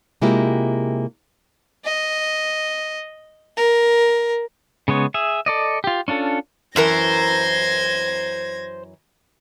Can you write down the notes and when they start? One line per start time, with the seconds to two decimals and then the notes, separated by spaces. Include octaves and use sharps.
0.22 C3 G#3 A#3 E4 F4 G4
1.84 D#5
3.57 A#4
4.88 C#3 G#3 B3 C#5
5.14 G#4 E5
5.46 A4 D5 D#5
5.84 F4 G4
6.08 C#4 D4 F4 A4
6.76 F#2 E3 A#4 C5 G#6 A#6